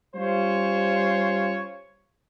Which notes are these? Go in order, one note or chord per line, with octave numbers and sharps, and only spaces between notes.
G3 C#4 F4 C5 C#5